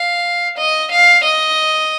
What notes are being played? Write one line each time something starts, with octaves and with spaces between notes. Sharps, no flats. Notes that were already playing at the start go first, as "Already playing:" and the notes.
Already playing: F5
D#5
F5
D#5